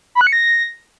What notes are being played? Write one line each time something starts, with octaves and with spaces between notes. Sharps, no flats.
B5
F#6
C#7
A#6